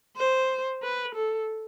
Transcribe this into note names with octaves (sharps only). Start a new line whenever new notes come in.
C5
B4
A4